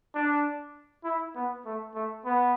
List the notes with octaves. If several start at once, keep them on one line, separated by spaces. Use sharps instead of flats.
D4
E4
B3
A3
A3
B3